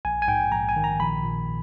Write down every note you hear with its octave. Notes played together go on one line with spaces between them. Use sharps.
A#1 G#5
G#5
G#2 G5
A#1 A#5
G#5
D#3
A#5
A#1 B5
A#2